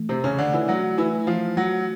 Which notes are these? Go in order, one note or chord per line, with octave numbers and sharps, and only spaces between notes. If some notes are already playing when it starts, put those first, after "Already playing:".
Already playing: E3 A3
C3 C4
C#3 C#4
D3 D4
E3 E4
F#3 F#4
E3 E4
F3 F4
F#3 F#4